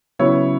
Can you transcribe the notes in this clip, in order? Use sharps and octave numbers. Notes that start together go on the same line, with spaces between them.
C#3 F#3 B3 E4 C#5